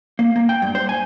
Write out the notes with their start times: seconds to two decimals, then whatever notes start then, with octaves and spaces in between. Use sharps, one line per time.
0.19 A#3
0.36 A#3
0.49 G5
0.62 G2
0.75 C5
0.89 G#5